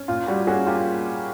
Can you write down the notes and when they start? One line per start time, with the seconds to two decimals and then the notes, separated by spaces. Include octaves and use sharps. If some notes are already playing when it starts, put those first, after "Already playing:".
Already playing: C#4
0.08 A#2 F4
0.28 G3 F#4
0.47 C#4 F#4 G#4
0.66 A#3 F4 G4